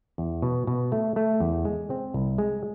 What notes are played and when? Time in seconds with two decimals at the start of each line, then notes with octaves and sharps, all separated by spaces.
0.18 E2
0.42 B2
0.67 B2
0.92 A3
1.16 A3
1.40 E2
1.65 G#3
1.90 C4
2.14 C2
2.38 G#3